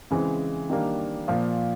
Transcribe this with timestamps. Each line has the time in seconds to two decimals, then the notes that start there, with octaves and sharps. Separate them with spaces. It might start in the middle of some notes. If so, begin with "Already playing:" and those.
0.11 C#3 E3 G#3 C4
0.70 D#3 G3 A#3 D4
1.28 A#2 F3 A#3